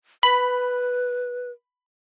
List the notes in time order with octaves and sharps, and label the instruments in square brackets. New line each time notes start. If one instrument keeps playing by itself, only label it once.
[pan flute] B4 [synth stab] B5